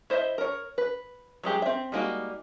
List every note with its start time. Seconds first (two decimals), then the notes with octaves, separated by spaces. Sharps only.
0.10 E4 C5 D#5 E5
0.38 A#4 C#5
0.78 B4
1.43 F#3 G#3 G4 G#4
1.62 C4 E5
1.92 G3 G#3 A#3 D#4 F#4